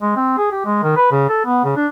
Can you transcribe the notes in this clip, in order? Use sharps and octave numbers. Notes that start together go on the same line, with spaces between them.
G#3
C4
G#4
G4
G#3
D#3
B4
C#3
A4
B3
C#3
D4